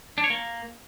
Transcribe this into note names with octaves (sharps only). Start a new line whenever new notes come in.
D4
C#5
A#3